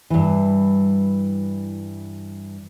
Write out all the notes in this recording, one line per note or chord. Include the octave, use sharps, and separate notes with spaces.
G2 E3